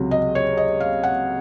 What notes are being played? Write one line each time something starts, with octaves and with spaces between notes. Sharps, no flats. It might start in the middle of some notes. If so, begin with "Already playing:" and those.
Already playing: C#2 C3 F#3
D#5
C#5
D#5
F5
F#5